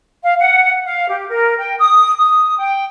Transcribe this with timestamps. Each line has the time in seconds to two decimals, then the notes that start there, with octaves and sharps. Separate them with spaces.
0.24 F5
0.39 F#5
0.85 F5
1.08 G4
1.28 A#4
1.58 G5
1.80 D#6
2.16 D#6
2.59 G5